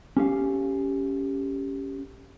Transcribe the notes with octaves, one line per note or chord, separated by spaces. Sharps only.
C#4 G4 A4 F5